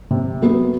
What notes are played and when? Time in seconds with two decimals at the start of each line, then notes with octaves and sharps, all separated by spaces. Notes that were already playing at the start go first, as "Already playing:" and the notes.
0.11 C3
0.42 F#3 B3